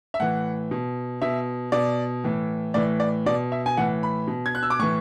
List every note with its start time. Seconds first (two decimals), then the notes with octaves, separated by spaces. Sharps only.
0.14 E5
0.20 A2 E3 F#5
0.71 B2
1.22 B2 E5
1.72 B2 D5
2.24 A2 E3
2.74 A2 E3 D5
3.00 D5
3.26 B2 D5
3.52 E5
3.66 G#5
3.77 A2 E3 F#5
4.03 B5
4.27 B2
4.46 G#6
4.55 F#6
4.63 E6
4.70 D6
4.79 A2 E3 C#6